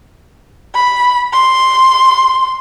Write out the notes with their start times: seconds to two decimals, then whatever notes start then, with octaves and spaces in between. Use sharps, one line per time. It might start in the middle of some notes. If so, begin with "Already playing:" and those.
0.75 B5
1.33 C6